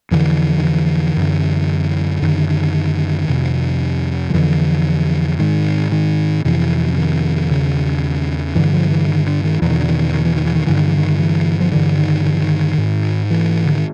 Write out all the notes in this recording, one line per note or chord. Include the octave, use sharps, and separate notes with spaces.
F2 D3 E3
D#3
E3
F#2 D3
F#2 D3 D#3
F2 C3
F3
F2 D3 E3
G#2 D#3
D#3
F2 C3 E3
D3
D#3
E2 C#3
G2 D3 E3
F3
E3
D#3
D3
D#3
E2 B2 E3
D#3
D3
D#3
D#3
E3
D#3
E3
D#3
G2 D3 E3
D#3
E3
D#3
E3
F3
G2 D3 E3
D#3
D#3
E3
D#3
G#2
E3
D3
D#3